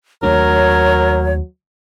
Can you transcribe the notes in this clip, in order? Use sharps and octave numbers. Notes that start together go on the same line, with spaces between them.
D#2 F#3 A3 D4 A#4 C#5